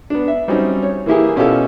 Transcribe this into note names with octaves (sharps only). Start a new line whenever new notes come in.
B3 D4
E5
F#3 G3 C4 C#4 D#4
C#5
E3 A#3 E4 G4 G#4
B2 C#4 E4 F4 G4 A4